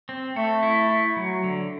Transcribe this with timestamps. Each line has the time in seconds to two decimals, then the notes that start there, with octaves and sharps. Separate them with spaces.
0.09 C4
0.36 A3 A4
0.63 E4
0.90 E4
1.17 F#3
1.44 D3